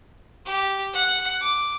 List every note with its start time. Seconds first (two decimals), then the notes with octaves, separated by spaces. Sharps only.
0.45 G4
0.93 F#5
1.40 D6